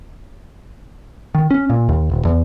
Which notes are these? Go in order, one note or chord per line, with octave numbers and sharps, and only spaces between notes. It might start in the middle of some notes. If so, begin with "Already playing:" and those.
D#3
C#4
A#2
D#2
D#1
E2